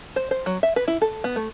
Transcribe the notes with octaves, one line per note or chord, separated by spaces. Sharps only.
C5
C5
F#3
E5
B4
E4
A4
B3
A3